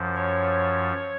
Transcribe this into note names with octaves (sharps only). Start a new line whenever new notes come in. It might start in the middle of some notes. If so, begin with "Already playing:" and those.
Already playing: F#2 F3
C#5